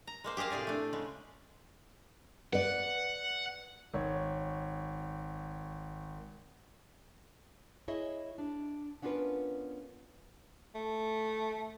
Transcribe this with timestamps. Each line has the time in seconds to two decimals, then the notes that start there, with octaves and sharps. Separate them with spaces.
0.07 A#5
0.24 G#3 A#3 C5
0.37 G4 G#4 C5 D#5 F5
0.50 A2 C3 G#4 D5 G#5
0.67 A3 D4
0.93 C#3 G#3
2.53 B4 D5 F#5
3.94 G#1 C#5
7.88 E4 G#4 C#5 D#5 E5
8.38 D4
9.02 B3 C#4 D4 F4 A#4 B4
10.75 A3